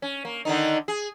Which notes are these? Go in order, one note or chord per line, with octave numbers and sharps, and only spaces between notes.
C#4
A#3
D3 D#3 D#4
G#4